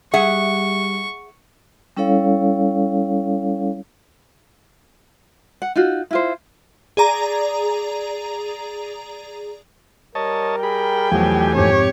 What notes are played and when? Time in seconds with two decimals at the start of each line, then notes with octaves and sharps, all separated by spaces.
0.14 G3 G#4 E5 F#5 C#6
1.97 G3 C#4 E4 A4 C#5 F5
5.62 F#5
5.76 D#4 F4 F#4
6.11 E4 F4 C5
6.97 G#4 D5 A#5
10.15 G3 A#4 C#5 D#5 A5
10.63 G#4 G5 B5
11.11 E2 B2 F3 F#3 A3 G4 G#5
11.55 F2 G#2 C3 G4 C#5